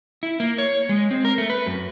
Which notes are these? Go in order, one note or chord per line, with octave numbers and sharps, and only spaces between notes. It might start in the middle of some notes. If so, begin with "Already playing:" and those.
E4
A#3
C#5
G#3
C4
A#4
A3
B4
F#2